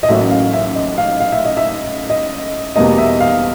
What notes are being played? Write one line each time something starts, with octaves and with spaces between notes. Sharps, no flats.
D#5
A1 A2 F#3 A#3 C#4 E5
F5
E5
D#5
F5
F5
E5
D#5
E5
D#5
E2 B2 G3 A#3 D#5
E5
F5